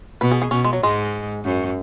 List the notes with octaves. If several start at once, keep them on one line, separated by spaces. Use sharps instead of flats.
B2 B4
G#4
G#4
B2 C#4
G#3
F#3
G#2 G#3
F#2